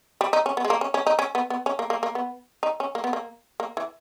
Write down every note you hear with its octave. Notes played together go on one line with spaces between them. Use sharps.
G3
D#4
C#4
B3
G#3
A#3
C#4
C#4
D#4
C#4
B3
B3
C#4
A#3
A#3
A#3
B3
D#4
C#4
A#3
B3
A#3
A#3
E3